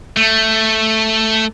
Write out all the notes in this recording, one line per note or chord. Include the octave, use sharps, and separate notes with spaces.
A3